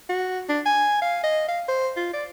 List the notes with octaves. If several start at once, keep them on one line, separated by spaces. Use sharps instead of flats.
F#4
D4
G#5
F5
D#5
F5
C5
F4
D5